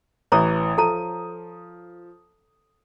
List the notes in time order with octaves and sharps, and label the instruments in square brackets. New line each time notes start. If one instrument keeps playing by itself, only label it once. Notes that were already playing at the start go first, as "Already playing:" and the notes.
[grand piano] A1 E3 D#6 [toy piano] C#5 A#5 C#6
[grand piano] F3 D#7 [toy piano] A4 A5 A#5